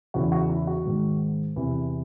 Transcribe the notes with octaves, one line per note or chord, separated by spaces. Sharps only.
E2 C#3 E3 F#4
F#4
E4
F#4
G#2 D#3
E2 C3 E3